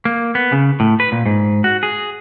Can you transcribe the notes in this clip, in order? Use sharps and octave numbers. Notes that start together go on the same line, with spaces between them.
A#3
B3
C#3
A2
B4
A#2
G#2
F#4
G#4